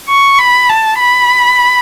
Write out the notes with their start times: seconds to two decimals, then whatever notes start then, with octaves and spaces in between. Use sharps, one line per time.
0.08 C#6
0.39 B5
0.69 A5
1.00 B5